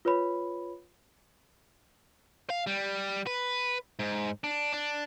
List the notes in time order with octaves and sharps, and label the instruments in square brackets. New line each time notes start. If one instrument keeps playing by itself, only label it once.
[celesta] F4 B4 C#5 B5
[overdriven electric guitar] F5
G3
B4
G#2
D4
D4